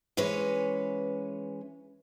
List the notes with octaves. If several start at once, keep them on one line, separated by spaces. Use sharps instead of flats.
E3 G#3 C#4 B4 C#5